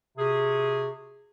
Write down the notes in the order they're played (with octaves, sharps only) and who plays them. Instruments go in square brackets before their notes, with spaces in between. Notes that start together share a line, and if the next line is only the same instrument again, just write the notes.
[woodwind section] C3 F#4 G#4